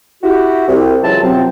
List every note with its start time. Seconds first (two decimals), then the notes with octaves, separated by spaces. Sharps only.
0.23 E4 F#4 G4
0.68 C2 C4
1.03 C#2 F#2 E3 F#3 F4 A5
1.22 F#2 C3 F3 F#3 C4